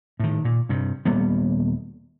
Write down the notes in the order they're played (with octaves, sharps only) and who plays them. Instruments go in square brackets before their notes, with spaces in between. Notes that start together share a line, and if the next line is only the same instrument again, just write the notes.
[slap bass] A2 D#3
A#2
G2 C3
D#1 G3 A#3 B3